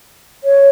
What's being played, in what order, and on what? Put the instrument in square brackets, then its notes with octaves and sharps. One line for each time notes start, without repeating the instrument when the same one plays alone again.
[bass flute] C#5